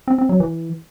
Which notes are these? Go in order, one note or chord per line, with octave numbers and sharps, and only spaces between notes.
C4
C4
F#3
E3